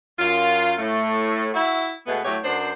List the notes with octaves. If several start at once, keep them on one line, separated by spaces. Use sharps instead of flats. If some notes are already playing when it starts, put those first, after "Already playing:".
F#2 F4
A2 A3
E4 F#4 E5
B2 G#3 A3 B3
A2 F#3 A3 G4 C#5
F#2 B3 D4 C5